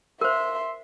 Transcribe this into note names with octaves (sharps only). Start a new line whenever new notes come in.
A#4 C5 E5 C6